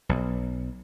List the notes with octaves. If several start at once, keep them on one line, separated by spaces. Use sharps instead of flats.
B1